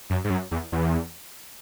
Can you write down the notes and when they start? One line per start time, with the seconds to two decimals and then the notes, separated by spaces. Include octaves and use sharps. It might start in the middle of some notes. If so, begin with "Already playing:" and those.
0.10 F#2
0.24 G#2
0.30 F#2
0.51 E2
0.72 E2